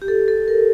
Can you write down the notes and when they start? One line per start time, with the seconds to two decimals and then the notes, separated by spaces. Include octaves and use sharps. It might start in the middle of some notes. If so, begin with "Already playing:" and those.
0.02 G4
0.08 A4
0.28 A4
0.48 A#4